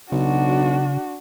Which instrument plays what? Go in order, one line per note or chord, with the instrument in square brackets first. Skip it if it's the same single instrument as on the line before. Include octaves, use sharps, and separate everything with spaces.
[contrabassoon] B1 [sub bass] C#3 [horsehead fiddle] D4 F#4